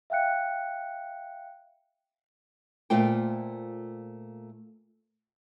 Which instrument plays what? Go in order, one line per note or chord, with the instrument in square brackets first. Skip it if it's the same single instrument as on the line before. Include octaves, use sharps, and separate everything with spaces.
[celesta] E5 F5 G5 F#6 C#7
[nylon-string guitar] A#2 A3 F4 C5 G5